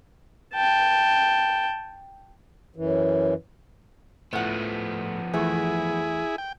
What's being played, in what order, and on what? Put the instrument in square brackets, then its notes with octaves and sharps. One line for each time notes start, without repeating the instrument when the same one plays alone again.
[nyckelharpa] G5 A5
[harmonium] F#2 E3
[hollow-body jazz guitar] A2 F#5 [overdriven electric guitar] F3 B3
[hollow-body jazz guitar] E2 E3 A3 [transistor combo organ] E4 G#4
[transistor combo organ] G5